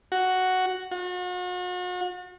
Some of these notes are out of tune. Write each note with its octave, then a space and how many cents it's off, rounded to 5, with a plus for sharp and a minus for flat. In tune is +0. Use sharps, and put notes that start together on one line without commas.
F#4 +5
F#4 -40